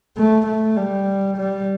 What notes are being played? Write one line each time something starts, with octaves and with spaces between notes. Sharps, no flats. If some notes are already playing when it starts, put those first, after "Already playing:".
A3
A3
G3
G3